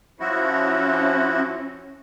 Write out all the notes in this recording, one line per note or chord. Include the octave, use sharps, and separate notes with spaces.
F3 C#4 E4 F#4